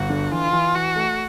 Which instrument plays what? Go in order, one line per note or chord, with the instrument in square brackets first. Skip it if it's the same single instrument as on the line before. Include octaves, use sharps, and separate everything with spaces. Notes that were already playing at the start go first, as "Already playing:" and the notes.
Already playing: [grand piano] G1 [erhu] F#4
[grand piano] D3
[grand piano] E3 [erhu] F4
[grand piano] E3
[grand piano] E3 [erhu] F#4
[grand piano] A3